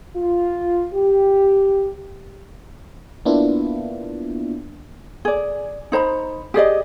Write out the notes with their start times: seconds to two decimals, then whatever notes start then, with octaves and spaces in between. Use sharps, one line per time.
0.16 F4
0.93 G4
3.25 A#3 B3 D4 E4 F4
5.25 G#4 D5
5.92 D#4 C5 A#5 B5
6.54 G4 G#4 D5 D#5